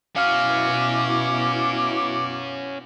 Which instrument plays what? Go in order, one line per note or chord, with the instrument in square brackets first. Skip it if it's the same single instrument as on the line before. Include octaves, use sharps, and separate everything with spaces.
[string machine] B2 E4 [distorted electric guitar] C#4 F#4 [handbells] F5 F6 [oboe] D6